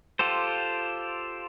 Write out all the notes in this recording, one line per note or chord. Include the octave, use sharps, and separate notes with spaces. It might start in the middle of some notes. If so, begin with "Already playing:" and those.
F4 G4 A4 C5